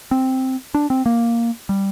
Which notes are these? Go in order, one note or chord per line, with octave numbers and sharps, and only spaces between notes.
C4
D4
C4
A#3
G3